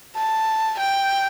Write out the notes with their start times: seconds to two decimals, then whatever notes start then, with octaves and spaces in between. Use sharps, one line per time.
0.17 A5
0.80 G5